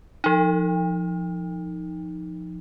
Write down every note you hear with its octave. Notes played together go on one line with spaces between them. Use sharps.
F3 D#4